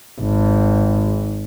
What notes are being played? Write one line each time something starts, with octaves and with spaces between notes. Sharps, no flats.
G#1